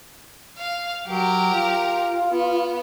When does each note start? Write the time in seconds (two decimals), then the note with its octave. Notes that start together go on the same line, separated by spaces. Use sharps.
0.58 F5
1.08 F#3 G4 A#4
1.54 F4
2.31 B3